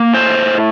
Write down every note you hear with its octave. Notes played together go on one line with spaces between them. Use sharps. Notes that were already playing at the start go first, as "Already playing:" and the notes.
Already playing: A#3
A2 C5